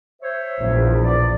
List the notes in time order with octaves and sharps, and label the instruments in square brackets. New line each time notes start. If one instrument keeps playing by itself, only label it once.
[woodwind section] C5 C#5 E5
[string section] A#1 E2
[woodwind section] D5